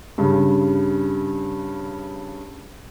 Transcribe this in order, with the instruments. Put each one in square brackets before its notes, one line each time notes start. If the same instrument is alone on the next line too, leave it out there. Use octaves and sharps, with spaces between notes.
[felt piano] G2 C#3